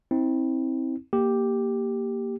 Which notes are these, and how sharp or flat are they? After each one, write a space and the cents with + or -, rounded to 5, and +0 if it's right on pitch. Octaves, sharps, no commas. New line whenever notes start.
C4 +10 E4 -40
A#3 +0 G4 +0